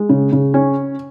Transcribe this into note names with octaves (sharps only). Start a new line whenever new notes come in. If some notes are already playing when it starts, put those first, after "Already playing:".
Already playing: G#3
C#3
C#3
C#4